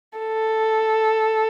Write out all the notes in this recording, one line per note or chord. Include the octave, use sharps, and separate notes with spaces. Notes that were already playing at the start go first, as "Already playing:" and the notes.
A4